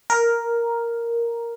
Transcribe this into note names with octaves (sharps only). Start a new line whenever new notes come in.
A#4